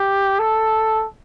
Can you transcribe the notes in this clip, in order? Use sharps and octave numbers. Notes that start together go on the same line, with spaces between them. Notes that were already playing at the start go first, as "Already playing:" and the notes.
Already playing: G4
A4